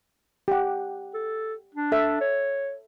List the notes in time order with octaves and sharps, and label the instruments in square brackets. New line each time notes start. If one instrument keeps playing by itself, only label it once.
[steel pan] G4 F#5
[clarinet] A4
D4
[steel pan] A4 E5
[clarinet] C#5